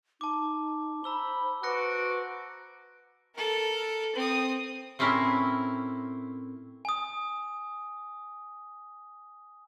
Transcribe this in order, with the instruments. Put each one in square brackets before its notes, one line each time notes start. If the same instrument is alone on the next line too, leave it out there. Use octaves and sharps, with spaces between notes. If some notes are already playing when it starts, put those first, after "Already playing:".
[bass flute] D#4 [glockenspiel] A5 D6
[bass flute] C5 [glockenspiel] A#5 E6 G7 [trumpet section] B5
[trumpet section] F#4 C5 D6 [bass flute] B4 [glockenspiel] F#6 A#6 C#7
[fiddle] A4 A#4
C4 D#6
[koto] A2 C4 C#4 E4 A#4
[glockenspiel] G#5 D#6